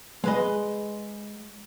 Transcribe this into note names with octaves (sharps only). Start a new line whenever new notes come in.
G#3 B4 D#5